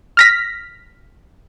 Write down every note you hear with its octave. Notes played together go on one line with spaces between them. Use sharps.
F6 A#6 B6